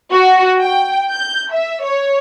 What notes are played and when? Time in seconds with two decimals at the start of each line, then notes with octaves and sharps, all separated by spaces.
0.11 F#4
0.60 G5
1.10 G6
1.52 E5
1.83 C#5